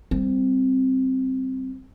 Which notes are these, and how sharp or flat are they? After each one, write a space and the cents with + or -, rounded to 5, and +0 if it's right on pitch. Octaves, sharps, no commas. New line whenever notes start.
G3 +0 C4 +0